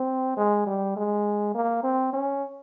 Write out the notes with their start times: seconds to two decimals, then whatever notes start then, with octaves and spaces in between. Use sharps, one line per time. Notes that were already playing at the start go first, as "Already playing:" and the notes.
Already playing: C4
0.37 G#3
0.67 G3
0.97 G#3
1.55 A#3
1.83 C4
2.13 C#4